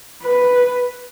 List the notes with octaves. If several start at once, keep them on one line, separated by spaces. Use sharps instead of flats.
B4